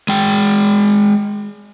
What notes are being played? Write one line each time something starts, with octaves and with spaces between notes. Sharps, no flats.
G#3 G5